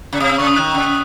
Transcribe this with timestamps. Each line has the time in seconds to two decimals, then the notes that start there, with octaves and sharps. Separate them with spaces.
0.13 C#3
0.20 C3 D#6
0.29 E6
0.38 C#3 C#6
0.47 D#6
0.56 D#3 F#6
0.74 C#3